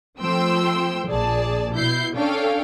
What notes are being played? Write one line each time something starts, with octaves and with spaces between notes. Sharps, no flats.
F3 A3 C4 G5 C6 E6
A#1 G#4 D5 A5
B2 E4 G6 C7
C#4 D4 A4 C#5 F5 G5